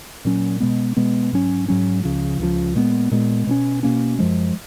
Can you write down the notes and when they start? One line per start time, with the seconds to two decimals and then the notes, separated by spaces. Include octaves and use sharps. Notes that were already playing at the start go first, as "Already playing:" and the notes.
0.25 A#2 F#3 C#4
0.60 B2 G#3 B3
0.97 B2 G#3 B3
1.32 G#2 F#3 C#4
1.68 G#2 F#3 C#4
2.03 C#2 C#3 F3
2.39 C#2 C#3 F3
2.75 A#2 G#3 B3
3.11 A#2 G#3 B3
3.47 B2 A#3 C#4
3.83 B2 A#3 C#4
4.19 F#2 F3 G#3